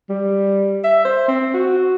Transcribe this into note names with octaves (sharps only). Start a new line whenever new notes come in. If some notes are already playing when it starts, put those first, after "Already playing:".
G3
E5
C5
C4
F#4